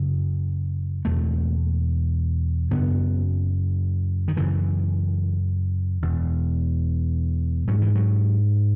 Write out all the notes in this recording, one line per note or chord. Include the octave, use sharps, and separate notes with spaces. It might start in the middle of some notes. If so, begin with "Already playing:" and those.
Already playing: F#2 C#3
E2 B2 A3
F#2 C#3 B3
D#3
F#2 C#3 E3
E2 B2
G#2 F#3
E3
F#3